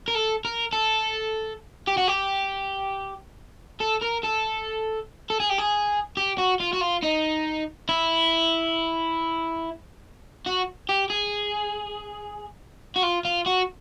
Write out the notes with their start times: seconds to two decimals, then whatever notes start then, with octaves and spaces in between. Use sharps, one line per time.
0.08 A#4
0.15 A4
0.45 A#4
0.73 A4
1.88 G4
1.98 F#4
2.08 G4
3.80 A4
4.01 A#4
4.23 A4
5.30 A4
5.40 G#4
5.50 G4
5.59 G#4
6.17 G4
6.38 F#4
6.60 F4
6.73 F#4
6.81 F4
7.03 D#4
7.89 E4
10.46 F#4
10.89 G4
11.10 G#4
12.96 F#4
13.03 F4
13.25 F4
13.46 F#4